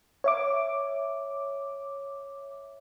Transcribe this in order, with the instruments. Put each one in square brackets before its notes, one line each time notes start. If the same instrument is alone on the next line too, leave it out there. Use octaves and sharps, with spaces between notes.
[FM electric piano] C#5 E5 D6